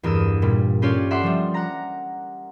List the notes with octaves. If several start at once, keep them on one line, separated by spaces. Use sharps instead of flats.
E2 G2 A#4 D#6 E6
A#2 G3
C#4 F4 G4 A4 C#5 D5
A4 D5 E5 F#5 C6
F3 G3
F#5 A#5